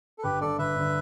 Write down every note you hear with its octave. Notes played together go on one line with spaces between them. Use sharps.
A4
G1 G4 B4
G2 D3 A4 D5
G1 B4 E5
G2 D3